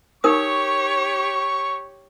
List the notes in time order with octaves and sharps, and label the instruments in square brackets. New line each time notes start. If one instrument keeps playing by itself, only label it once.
[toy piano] D#4 A#4 D#6 [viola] G4 C#5 [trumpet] C#6